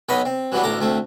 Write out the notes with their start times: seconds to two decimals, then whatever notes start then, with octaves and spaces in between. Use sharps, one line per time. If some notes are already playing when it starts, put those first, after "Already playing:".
0.09 B1 B3 C#4 D#5 B5
0.25 C4
0.52 E3 F#3 G3 B3 D4
0.63 A1 D2 A4 A#5 D6
0.81 D2 A3 C4